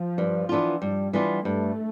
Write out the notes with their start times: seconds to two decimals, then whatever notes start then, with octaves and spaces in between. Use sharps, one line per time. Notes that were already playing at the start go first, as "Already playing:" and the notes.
Already playing: F3
0.18 G2
0.49 E3 B3 D4 F4
0.81 G2 G3
1.13 E3 B3 D4 F4
1.45 G2 A3